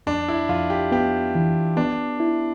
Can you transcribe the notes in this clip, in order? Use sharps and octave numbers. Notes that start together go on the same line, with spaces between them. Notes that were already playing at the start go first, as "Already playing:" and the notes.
F2 D4
E4
F2 F4
G4
B3 G4
E3
B3 D4
E4